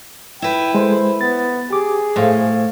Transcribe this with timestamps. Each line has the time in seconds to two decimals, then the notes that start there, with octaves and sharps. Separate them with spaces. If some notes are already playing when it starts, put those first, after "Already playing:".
0.42 E4 B4 G5
0.74 G#3 A4 C5
1.21 B3 A6
1.70 G4 G#4 D6
2.16 A2 A4 C5 F5